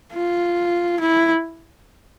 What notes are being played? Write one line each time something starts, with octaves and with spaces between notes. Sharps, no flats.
F4
E4